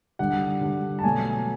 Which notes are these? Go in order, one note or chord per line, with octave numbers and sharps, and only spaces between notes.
D3 G3 F#5
D3 G3
A5
B2 F#3 A3 G#5